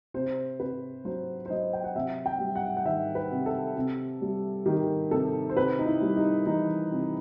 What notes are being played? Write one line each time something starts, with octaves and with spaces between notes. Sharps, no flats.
C3 C5
C3 B4
F#3 C5
C5
F#3 D#5
G5
F#5
C3 E5
G5
G3
F#5
F#5
D#3 E5
B4
C3
A4
C3
G3
D#3 G4
C3 A4
C5
C3 B4
D#4
E4
G3
D#4
E3 D#4
C3